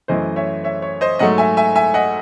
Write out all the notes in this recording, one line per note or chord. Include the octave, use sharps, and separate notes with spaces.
F#2 E3 A3 C5 D#5
C#5 E5
C#5 E5
C#5
C5 D#5
G#2 F#3 A3 D#5 F#5
E5 G#5
E5 G#5
E5 G#5
D#5 F#5